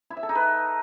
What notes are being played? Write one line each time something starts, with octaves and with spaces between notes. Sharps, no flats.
E4
E5
A4
D#4
B4